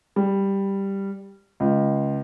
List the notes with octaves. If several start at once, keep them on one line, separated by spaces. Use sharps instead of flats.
G3
C#2